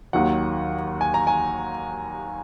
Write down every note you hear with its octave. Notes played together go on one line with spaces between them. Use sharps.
D#2 D#3 F#3 F#5
G#5
A#5
G#5